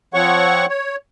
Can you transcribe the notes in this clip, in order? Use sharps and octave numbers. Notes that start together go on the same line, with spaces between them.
F3 C4 C#5 F#5 C#6
C#5